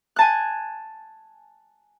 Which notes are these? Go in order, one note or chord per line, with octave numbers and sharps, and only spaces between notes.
G#5 A5 F#6